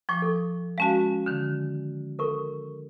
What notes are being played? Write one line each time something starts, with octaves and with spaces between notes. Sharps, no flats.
F3 G5 C#6 D6
A4
G#3 C#4 F#4 F5 G#5 A5
D3 D#3
A4 A#4 C#6